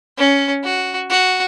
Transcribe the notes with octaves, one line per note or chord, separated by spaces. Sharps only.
C#4
F#4
F#4